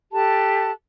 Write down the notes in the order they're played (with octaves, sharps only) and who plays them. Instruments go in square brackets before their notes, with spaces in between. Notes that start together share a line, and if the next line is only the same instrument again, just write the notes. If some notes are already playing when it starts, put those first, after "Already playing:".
[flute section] G4 A4 A5 F#6